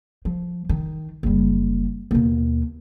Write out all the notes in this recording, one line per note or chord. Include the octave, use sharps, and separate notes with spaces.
F3
D#3
F#1 G3
D#2 B2